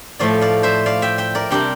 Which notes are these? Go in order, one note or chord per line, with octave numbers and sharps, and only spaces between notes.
A2 F3 A3 D5 F5
D5 F5
C5 E5
D5 F5
E5 G5
E5 G5
A#4 D5
C3 G3 D4 G4 A#4